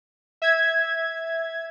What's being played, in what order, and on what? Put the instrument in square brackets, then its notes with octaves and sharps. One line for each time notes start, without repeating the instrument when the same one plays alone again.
[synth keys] E5 G#6